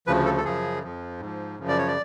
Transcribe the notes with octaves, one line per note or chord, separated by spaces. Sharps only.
D2 C#3 F3 B4
A4
A4
F#2 C#3 F3 G#4
F2 F3
G#2 F3
F#2 C#3 F3
D5
C#5
D5